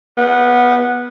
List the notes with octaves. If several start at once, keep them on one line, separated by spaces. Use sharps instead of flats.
B3